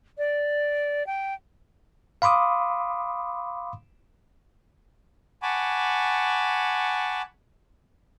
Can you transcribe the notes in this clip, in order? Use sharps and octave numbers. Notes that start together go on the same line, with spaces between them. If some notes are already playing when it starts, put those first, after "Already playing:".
D5
G5
F5 B5 C6 D6 D#6
F#5 G#5 A5 B5 C#6 D6